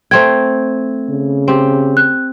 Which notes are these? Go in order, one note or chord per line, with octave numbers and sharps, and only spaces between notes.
A3 C4 C5 G5 G#6
C#3
C4 G4
F#6